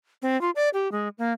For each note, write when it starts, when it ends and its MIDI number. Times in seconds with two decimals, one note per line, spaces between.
0.22 0.39 60
0.41 0.50 65
0.56 0.69 74
0.74 0.91 67
0.92 1.08 56
1.18 1.33 58